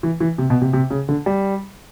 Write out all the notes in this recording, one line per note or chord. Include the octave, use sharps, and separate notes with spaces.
E3
E3
C3
B2
C3
C3
C#3
D3
G3